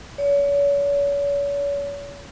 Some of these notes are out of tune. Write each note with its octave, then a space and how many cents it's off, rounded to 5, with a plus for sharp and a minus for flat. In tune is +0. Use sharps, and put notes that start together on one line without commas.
C#5 +40